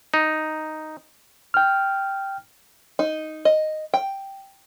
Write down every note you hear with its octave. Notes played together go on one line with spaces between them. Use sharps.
D#4
G5 F6
D#4
D#5
G5